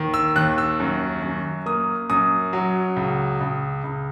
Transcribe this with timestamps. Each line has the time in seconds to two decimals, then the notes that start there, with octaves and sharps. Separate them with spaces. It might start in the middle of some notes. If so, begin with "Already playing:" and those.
Already playing: D#2 D#3
0.14 E6
0.36 D#2 F#6
0.58 E6
0.80 F#2
1.22 F#2
1.66 A#3 D#6
2.10 F#2 D#6
2.53 F#3
2.96 C#2
3.40 C#2
3.84 C#2